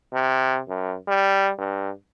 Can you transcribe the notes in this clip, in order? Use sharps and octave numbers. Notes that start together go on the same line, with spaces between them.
C3
F#2
G3
G2